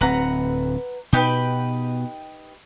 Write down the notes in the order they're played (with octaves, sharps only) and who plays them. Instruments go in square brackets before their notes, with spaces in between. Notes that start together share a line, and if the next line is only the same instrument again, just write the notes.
[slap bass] D1 C4 [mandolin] B4 F#5 A#5
[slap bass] B2 [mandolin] D#4 G4 B4